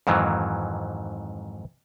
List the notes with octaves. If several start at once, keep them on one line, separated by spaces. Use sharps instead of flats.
F2 G#2 D#3 E3 F#3